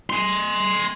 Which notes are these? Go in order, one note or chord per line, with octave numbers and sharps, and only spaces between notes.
G#5 C6